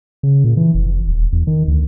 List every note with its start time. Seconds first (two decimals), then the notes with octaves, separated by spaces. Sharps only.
0.23 C#3
0.44 A#2
0.57 E3
0.74 F1
1.08 D#1
1.32 E2
1.47 D#3
1.68 D2